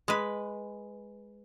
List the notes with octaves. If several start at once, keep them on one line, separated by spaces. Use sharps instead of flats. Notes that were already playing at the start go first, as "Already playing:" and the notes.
G#3 B4